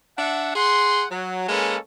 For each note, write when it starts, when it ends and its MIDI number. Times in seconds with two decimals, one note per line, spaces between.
0.18 0.54 62
0.18 0.54 76
0.18 0.54 78
0.55 1.04 68
0.55 1.04 78
0.55 1.04 84
1.11 1.46 54
1.49 1.77 56
1.49 1.77 58
1.49 1.77 61
1.49 1.77 69
1.49 1.77 71